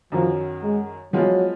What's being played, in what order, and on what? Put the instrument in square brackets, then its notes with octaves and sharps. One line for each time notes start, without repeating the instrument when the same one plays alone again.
[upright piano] F#2 D#3 F#3 [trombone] F3
[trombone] G#3
[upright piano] F3 G#3 B3 F4 [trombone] F#3